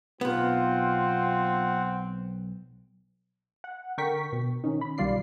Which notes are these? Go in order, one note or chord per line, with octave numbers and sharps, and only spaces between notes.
B1 B3 C4 F4 F#5
F#5
D3 A#4 G5 C#6 B6
B2
D#3 C#4 D#4
B5
B1 D#3 G3 F4 D5 C7